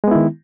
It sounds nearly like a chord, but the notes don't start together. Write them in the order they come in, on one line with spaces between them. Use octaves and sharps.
G#3 B3 E4 D#3